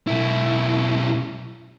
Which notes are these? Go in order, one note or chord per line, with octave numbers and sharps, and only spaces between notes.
B1 E4